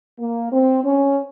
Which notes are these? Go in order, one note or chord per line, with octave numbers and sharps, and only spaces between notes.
A#3
C4
C#4